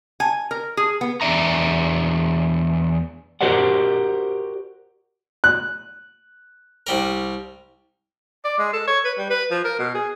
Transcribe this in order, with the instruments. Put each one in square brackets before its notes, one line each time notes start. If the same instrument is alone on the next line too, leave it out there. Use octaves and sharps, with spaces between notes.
[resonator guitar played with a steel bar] G#5
A#4
G#4
B3
[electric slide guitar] E2 A#2 D4 D5 E5 A#5
[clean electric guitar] F#4 G4 A#4 C5 D5 F#5
[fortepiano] F#6
[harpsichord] C2 G3 A#4
[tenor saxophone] D5
G#3
A4
C#5
B4
G3
B4
F3
A#4
B2
G#4